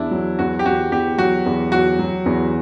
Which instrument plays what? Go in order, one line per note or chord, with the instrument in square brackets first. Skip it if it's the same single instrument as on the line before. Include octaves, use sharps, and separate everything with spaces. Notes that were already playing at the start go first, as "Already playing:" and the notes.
Already playing: [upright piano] E2 [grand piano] D4 E4
[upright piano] F#3
[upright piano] E2 [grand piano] F#4
[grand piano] G4
[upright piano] E2 [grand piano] F#4
[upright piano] E2 [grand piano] G4
[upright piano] F#3 [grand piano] F#4
[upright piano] E2
[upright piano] F#3 [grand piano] F#4
[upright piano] F#3
E2